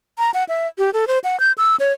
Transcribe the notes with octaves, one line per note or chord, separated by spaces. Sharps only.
A#5
F#5
E5
G4
A4
C5
F#5
G6
E6
C#5